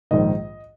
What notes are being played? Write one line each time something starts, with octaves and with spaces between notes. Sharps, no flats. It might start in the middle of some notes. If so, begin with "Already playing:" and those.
A#1 G#2 D#3 D#5